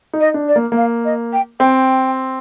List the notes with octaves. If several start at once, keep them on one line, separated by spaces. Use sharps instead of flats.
D#4
D#5
D4
D5
A#3
A#3 F5
D#5
G5
C4 G5